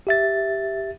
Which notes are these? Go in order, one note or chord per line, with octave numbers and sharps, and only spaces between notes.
G4 E5 A6